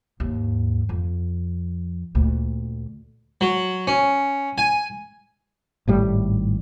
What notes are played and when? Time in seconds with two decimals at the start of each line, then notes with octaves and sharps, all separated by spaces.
0.20 D#2 G#2
0.89 F2
2.15 D2 A#2
3.41 F#3
3.87 C#4
4.58 G#5
5.88 G#1 A2 G3